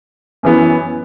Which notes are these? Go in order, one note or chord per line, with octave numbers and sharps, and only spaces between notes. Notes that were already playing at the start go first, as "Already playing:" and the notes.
F#2 E3 B3 E4